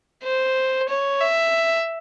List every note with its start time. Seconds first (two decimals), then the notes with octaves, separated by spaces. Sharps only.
0.23 C5
0.89 C#5
1.21 E5